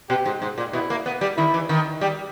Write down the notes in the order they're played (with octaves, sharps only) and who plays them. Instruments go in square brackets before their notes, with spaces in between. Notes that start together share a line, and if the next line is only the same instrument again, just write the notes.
[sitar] B2 [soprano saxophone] G4
[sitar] G#2
G#2
A#2
[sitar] B2 [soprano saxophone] E4
[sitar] A#3
B3
G3
[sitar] D#3 [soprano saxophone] E4
[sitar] E3
D#3
[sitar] G3 [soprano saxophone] G4